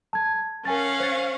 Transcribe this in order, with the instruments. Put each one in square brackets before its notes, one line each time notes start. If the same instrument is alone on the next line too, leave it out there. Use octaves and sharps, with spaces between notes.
[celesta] A5 G#6
[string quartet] C#4 F5 F#5 [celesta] A#4 G#5 A6
[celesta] C5 A6